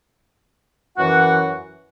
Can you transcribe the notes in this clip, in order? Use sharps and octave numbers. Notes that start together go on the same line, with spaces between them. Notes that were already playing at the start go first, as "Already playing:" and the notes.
F#2 E3 F#4 F#5